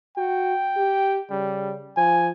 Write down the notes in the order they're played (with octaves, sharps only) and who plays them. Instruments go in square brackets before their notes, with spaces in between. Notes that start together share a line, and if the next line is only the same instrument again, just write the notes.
[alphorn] F#4 [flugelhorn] G5
[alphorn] G4
[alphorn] C#3 [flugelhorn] G3
[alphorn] F3 [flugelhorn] G#5